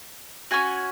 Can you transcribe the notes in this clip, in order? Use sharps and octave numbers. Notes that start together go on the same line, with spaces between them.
C#4 F#4 G#5